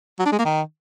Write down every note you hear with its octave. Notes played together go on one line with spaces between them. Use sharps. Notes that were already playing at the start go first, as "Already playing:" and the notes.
F#3
D4
G#3
A#3
D#3